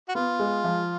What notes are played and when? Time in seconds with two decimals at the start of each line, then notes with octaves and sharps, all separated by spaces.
0.09 F#4
0.15 B3 F4
0.39 G#3
0.64 F3